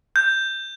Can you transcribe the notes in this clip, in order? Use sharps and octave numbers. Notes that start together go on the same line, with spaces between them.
G6